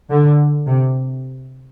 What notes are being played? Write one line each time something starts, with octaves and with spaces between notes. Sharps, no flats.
D3
C3